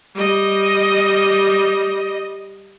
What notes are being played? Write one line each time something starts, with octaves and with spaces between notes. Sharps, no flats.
G3 D#5